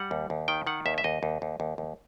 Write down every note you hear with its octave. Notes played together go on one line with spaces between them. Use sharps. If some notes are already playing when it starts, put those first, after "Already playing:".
Already playing: G3 F#5
D#2
D#2
D#3 G5
D#3 F#5
D#2 E5
E5
D#2 D#5
D#2
D#2
D#2
D#2